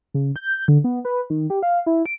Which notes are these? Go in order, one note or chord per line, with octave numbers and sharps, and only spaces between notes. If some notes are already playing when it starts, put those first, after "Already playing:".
C#3
G6
D3
B3
B4
D#3
G4
F5
E4
D7